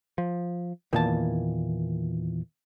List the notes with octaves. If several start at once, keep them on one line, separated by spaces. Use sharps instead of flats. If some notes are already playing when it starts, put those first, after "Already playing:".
F3
E2 A#2 D#3 E3 A#3 A5